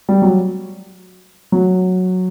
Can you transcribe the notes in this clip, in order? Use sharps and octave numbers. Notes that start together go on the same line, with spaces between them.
G3
F#3
F#3